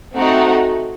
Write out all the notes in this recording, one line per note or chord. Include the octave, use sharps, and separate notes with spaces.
A3 C4 D#4 F#4